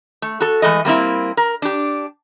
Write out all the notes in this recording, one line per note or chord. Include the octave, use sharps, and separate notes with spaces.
A3
F#4 A4
E3 G#3 A3 D#5
G3 A#3 C4 E4
A#4
D4 G4